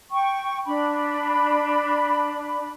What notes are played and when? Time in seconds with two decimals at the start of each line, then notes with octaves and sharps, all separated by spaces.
0.11 G5 C#6
0.66 D4 B5